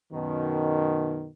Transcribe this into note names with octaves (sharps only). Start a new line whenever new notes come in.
F#2 B2 D#3